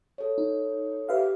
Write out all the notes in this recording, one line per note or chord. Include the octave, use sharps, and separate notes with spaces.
A4 C#5
D#4
G4 B4 E5 F5